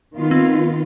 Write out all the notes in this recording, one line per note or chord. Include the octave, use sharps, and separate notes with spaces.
D#3 B3 F4
C4